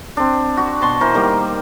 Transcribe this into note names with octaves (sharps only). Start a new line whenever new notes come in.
C4 D4
F#4
B2 A5 C6 C#6
E3 A#4 C5
D#3 G3 A#3